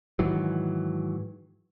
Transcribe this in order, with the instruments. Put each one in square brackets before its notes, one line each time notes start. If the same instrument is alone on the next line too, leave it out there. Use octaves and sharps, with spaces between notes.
[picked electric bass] G#2 D#3 E3 F#3